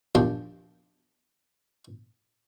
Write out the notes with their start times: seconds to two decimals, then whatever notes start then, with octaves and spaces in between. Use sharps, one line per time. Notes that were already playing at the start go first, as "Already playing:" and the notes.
0.15 A#1 D#2 D4 G4 C6